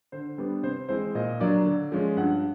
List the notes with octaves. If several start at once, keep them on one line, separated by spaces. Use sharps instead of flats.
D3 C5
G3 B3 D4
C3 C5
E3 G#3 C4 C5
A#2 D#5
F#3 A#3 D4 D5
D3
F3 G#3 C#4
G2 F#5